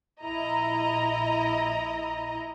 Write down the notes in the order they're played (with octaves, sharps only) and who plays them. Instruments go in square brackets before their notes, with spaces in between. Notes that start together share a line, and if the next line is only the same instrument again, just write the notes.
[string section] A#1 E4 D#5 A#5